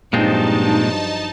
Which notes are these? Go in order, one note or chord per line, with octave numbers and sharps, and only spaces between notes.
G2 A#2 F3 F#3 G#3 C4 D#4 A5